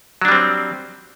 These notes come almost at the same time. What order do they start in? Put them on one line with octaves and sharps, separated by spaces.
F#3 D4 G3 C4